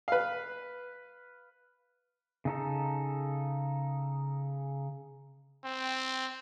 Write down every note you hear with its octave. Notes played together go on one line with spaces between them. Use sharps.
B4 F5
C#3 D#4 A4
C4